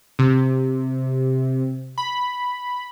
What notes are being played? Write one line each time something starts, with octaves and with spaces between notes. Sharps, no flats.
C3
B5